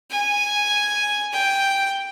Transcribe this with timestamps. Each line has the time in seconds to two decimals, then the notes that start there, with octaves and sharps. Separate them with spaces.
0.11 G#5
1.34 G5